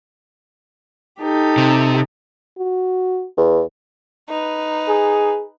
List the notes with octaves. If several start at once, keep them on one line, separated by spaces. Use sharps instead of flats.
D#4 G4 A4
C3
F#4
E2
D#4 B4
G#4